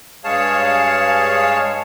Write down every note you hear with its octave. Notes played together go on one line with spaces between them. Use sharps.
G2 G#3 G#4 C#5 F5 A5